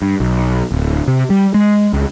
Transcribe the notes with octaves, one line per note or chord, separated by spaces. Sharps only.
G2
B1
D1
C3
G3
G#3
C#2